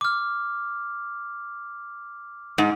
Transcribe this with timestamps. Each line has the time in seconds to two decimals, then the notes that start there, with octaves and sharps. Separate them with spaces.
0.01 D6 F6
2.58 G#2